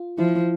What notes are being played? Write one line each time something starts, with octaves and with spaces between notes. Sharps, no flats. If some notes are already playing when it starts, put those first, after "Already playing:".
Already playing: F4
F3 E4